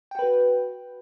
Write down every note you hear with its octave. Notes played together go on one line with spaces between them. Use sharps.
F#4 B4 G5